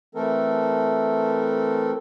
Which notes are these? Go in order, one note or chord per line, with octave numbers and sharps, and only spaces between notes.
E3 A3 C4 A4 A#4